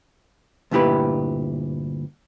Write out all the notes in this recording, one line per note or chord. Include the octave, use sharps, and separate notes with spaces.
D2 G2 A#2 E4 G4 B4